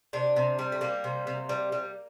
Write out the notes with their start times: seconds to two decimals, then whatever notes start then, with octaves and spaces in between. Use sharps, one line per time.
0.13 C3 D4
0.36 C3
0.59 G3
0.72 A3
0.81 G3 A#3
1.04 C3
1.27 C3
1.49 G3
1.72 G3